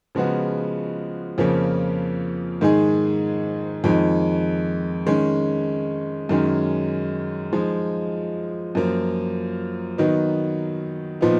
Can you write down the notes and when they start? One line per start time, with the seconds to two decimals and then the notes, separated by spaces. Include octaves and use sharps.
0.15 C#3 F3 G#3 B3 F#4
1.38 F2 C#3 F3 A#3 C#4
2.61 G#2 D#3 G#3 D#4 G#4
3.84 F2 D#3 G#3 D#4
5.06 D#3 G#3 C#4
6.29 F#2 D#3 G#3 C#4
7.53 F3 G#3 D#4
8.75 F#2 F3 A#3
9.98 D#3 F#3 B3 D#4
11.21 A#2 F3 B3 D#4